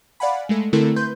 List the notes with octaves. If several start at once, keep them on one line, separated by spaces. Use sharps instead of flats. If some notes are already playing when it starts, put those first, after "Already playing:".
D5 F5 F#5 G#5 B5
G#3 A3 A4
D3 A3 C4 E4 A4 A#4
B4 C6 G6